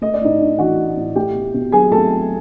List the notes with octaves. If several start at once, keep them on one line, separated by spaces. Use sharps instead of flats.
A3 D#5
D5
A2 D#4 D#5
D4
E3 F#4 F#5
A3
A2
A3 G4 G5
B2
B2
F#3 G#4 G#5
A3 A4 A5